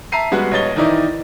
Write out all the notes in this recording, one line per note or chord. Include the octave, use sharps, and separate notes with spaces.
E5 A5 A#5 C7 D#7
G3 G#3 B3 F#4
A#1 B3 C#5 D#5 A6 G7
D#3 E3 D#4 E4 D5 D#5